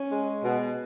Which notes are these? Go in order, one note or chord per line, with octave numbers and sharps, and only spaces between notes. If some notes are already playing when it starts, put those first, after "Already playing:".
Already playing: C#4
G#3
B2